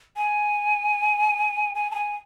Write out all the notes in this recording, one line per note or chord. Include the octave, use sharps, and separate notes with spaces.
G#5
G#5
A5
G#5